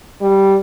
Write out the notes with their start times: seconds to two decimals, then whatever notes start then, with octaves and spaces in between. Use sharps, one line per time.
0.21 G3